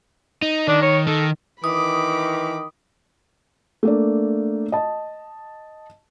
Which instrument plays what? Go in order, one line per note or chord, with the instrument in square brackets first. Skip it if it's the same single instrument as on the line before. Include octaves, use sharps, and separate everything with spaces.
[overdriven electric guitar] D#4
[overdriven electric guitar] D#3 [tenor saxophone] D4
[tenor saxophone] C#5
[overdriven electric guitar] D#3 [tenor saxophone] A4
[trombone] D#3 [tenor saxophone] E3 [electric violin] B5 D6 [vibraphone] D#6
[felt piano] A3 A#3 D4
D#5 A5